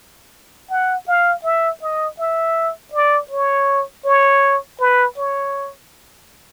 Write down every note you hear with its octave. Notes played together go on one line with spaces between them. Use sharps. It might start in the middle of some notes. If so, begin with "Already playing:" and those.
F#5
F5
E5
D#5
E5
D5
C#5
C#5
B4
C#5